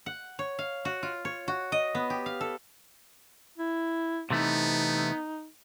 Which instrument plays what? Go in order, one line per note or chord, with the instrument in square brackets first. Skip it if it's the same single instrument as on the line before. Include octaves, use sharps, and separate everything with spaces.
[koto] F#5
C#5
F5
F#4
F4
C#5
F#4
D#5
B3
G4
F5
A4
[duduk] E4
[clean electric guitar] C3 E3 A3 [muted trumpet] B3 [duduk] D#4